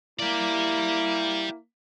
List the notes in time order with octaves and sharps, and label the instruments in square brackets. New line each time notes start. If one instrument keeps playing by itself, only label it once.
[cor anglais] A#3 [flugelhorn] E4 [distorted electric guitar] G4 D5